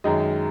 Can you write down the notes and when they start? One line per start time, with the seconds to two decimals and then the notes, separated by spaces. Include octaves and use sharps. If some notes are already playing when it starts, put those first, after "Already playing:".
0.04 F#2 D#3 G#3 D#5